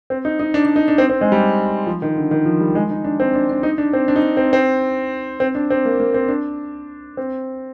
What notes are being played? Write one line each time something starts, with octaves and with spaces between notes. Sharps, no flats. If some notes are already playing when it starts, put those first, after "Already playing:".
C4
D#4
D#4
D4
D4
D#4
D4
C4
C4
G#3
G3
F3
D#3
D3
D#3
F3
G3
G#3
D#4
D4
C4
D4
D4
D#4
D4
C4
D4
D#4
D4
C4
C4
C4
D4
C4
A#3
A#3
C4
D4
C4